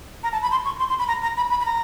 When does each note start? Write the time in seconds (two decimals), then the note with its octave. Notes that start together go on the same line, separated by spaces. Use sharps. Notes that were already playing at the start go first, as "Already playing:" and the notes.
0.23 A#5
0.32 A5
0.42 B5
0.51 C6
0.65 C#6
0.79 C6
0.89 C6
0.99 B5
1.08 A#5
1.23 A#5
1.37 B5
1.50 B5
1.61 B5
1.65 A#5